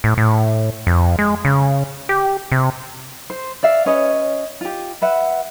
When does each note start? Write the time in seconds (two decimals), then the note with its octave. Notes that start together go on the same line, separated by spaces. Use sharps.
0.04 A2
0.18 A2
0.87 F2
1.19 G#3
1.45 C#3
2.09 G4
2.52 C3
3.30 C5
3.63 D5 E5 F5
3.86 C#4 B4 C#5 D#5
4.61 F4 G4
5.02 B4 E5 F#5